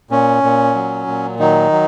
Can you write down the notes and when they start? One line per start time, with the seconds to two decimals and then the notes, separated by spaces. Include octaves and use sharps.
0.11 A#2 C#4
0.43 A#2
0.75 F#3
1.07 A#2
1.39 D#3 F#3 D#4
1.72 F#3